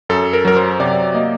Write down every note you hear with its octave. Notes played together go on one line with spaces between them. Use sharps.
F#2 A4
A#4
F#3 A#4
C5
C3 D5
A#3 D#5